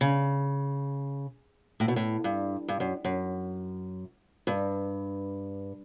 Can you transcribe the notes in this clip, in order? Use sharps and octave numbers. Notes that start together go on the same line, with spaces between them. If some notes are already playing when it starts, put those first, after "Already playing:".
C#3
A2
B2
A2
G2
G2
F#2
F#2
G2